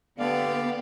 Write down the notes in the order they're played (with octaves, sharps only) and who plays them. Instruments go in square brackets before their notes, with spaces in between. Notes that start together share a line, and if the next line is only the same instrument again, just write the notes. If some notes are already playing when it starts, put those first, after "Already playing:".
[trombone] D3 [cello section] B3 [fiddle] G4 [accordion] D5 F5